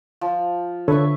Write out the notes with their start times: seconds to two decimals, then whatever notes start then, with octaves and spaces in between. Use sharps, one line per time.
0.21 F3
0.88 D3 A4 B4 C#5 E5 C#6